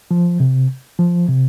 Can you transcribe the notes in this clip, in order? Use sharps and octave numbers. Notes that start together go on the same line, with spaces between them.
F3
C3
F3
C3